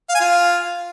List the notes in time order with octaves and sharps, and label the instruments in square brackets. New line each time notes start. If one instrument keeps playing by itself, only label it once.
[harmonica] F5
G#5
F4